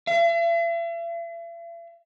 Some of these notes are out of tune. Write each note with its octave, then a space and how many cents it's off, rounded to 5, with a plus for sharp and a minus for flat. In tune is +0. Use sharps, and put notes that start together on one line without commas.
E5 +45